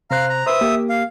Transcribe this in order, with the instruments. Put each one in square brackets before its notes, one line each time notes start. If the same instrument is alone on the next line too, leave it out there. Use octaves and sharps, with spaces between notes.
[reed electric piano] C3 C5 F#6 [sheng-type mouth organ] F5 A#5 F6
[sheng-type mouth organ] A#5
[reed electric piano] B4 C5 [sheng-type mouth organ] E5 D#6
[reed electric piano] A#3 G4
[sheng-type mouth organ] F5